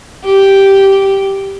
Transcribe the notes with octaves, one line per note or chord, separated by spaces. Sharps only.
G4